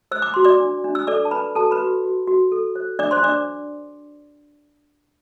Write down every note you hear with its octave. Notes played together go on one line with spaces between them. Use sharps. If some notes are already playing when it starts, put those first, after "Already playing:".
C5 E6
D6
F#4 C6
D5 D6
D4
D4
E6
A4 D5 D6
A5
D4 B4 B5
F#4 A4 A5
B4 B5
F#4
F#4
F#4
A4
C5
D4 D5 D6
C5 C6
D4 D5 D6